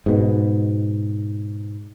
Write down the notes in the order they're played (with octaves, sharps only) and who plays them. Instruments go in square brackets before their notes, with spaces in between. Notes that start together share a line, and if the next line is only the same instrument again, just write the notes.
[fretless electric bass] G#2 B2